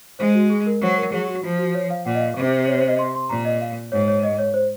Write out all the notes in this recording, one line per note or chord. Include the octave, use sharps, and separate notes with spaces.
G#3 C5
F#4
G#4
A#4
F#3 C5
A#4
F#3 G#4
F#4
F3 F4
F#4
C#5
F5
A#2 F#5
D#5
F5
C3
C#5
C5
D#5
C6
C6
A#2 A#5
D#5
F5
G#2 C#5
C#5
D#5
C#5
C5